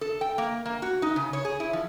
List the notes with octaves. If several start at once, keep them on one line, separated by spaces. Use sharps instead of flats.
A4
G5
A#3
A#3
F#4
D#4
C#3
C#5
G#4
E4
F3